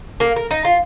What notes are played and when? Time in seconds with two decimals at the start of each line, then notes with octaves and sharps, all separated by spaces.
0.20 A#3
0.36 A#4
0.51 D#4
0.65 F4